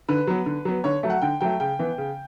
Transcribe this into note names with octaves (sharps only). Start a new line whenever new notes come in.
D3 B4
F#3 B3
D3
F#3 B3
D3 C#5
F#3 A3
F#5
D3 G5
F#3 A3 G5
C#3 G5
E3 B3
C#3